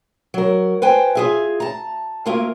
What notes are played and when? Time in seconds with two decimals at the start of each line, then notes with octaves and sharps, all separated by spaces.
0.34 F#3 A#4
0.82 B4 C5 G5 G#5
1.15 F4 G#4 E5
1.60 A5 A#5
2.26 D2 A#3 F4 A#4 E5